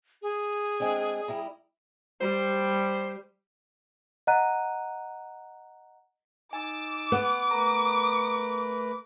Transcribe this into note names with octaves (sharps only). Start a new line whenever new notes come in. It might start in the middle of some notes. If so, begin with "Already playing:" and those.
G#4
G#3 C4 D4
G3 E4 A#5
G3 C5
D#5 F#5 A#5 F#6 D#7
D#4 G#5 D6 E6 A6
B3
A3 A#4 B4 A#5